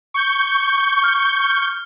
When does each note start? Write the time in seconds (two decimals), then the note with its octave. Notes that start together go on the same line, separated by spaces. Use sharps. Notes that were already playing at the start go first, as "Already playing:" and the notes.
0.14 C#6 G6
1.04 F6